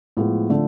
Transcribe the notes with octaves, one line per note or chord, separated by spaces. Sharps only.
A2 F3 G#3 B3
D3 F3 A3